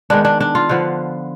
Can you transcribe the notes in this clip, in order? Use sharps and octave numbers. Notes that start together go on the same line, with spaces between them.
D#3 G#3 B3 D4
D4
D4
F4
D3 F3 B3